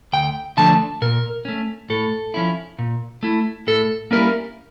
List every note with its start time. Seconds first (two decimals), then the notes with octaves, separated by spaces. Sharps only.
0.13 D2 G5
0.57 D3 F3 A3 D4 A5
1.02 A#2 A#4
1.45 A3 C#4
1.90 A2 A4
2.34 F3 C#4 E4
2.79 A#2
3.23 A3 E4
3.67 A2 A4
4.11 G3 A#3 C#4 E4 A#4